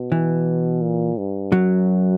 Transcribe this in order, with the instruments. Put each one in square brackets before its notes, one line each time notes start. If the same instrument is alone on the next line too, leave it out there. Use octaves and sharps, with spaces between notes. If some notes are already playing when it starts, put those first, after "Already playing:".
Already playing: [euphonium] B2
[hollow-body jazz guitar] E3
[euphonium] A#2
G2
[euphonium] F#2 [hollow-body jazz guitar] F#3